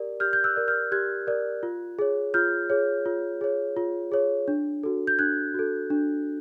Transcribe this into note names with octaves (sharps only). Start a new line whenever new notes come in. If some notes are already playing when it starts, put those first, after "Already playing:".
Already playing: G4 A#4 D5
G4 F6 G6
G6
E6 F#6
A#4 D5
F6 G6
G4 F#6 G#6
A#4 D5
F4
G#4 C#5
F4 F6 G6
G#4 C#5
F4
G#4 C#5
F4
G#4 C#5
D4
F#4 A4
G6
D4 F#6 G#6
F#4 A4
D4